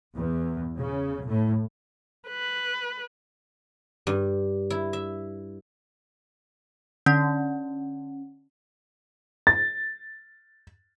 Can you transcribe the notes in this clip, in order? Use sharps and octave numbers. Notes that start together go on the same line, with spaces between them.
E2
C#3
A2
B4
G2
E4
E5
D3 C#4
A6